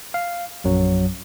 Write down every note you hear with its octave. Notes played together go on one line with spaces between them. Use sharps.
F5
A#1 F#2 F#3